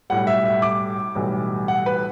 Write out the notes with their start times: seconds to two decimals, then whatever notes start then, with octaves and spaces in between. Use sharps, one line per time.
0.10 B1 A2 G3 F#5
0.27 E5
0.45 E5
0.62 D6
1.15 B1 A2 E3 G3
1.68 F#5
1.86 B4